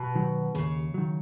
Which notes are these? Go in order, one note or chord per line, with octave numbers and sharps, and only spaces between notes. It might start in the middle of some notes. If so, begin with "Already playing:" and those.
Already playing: B2
D#3 F#3
D#2 C#3
D#3 F#3